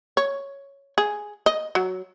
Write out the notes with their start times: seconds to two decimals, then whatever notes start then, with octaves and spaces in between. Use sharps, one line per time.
0.17 C#5
0.98 G#4
1.46 D#5
1.75 F#3